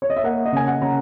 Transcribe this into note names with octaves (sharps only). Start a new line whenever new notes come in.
C#5
D#5
E5
A#3 F#5
D#5
C#3 G#5
F#5
C#3 A#5